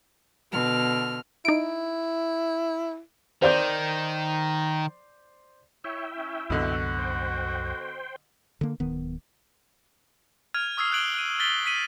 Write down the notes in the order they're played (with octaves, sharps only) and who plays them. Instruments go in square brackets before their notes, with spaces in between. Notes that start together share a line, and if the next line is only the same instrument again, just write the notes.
[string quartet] B2 D3 F6
[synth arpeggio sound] D#4 D7 [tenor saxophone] E4
[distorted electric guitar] D#3 [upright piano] C5 D5 G6
[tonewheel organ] E4 E5 G5 [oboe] C#5
[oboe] C#4
[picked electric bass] C2 F#2 [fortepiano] B2 D3 [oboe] F#4
[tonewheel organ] C5 G5
[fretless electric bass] D3 A#3
D1 D#3 B3
[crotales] F6 G#6 D#7 F7
C#6 D#6 E6 G#6 C7
F6 F#6 G#6 D7 F#7 G7
F#6 D#7
F6 A6 B6 G7
F#6 B6 C7 D#7 F#7 G7